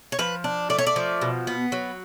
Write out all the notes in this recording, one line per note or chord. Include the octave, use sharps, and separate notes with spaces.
C#5
F3 B4
D4
A3 D5
C#5
D5
F3
B2
B3
F#3